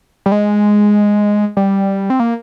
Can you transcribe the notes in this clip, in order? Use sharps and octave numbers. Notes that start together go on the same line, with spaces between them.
G3
G#3
G3
C4
A#3